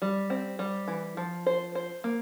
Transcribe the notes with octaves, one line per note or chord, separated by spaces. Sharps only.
G3
C4
G3
E3
F3
C5
C5
A#3